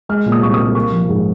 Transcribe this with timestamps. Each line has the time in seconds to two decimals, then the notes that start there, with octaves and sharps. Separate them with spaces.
0.09 G#3 F6
0.26 A#2
0.32 D#6
0.42 C2 C#6
0.54 D#6
0.59 C2
0.75 A#3 C#6
0.92 F3
1.09 G#2